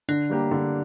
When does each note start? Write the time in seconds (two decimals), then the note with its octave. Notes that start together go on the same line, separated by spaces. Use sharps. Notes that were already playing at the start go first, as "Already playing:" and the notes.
0.09 D3 D4
0.30 G3 A#3 G4
0.51 D3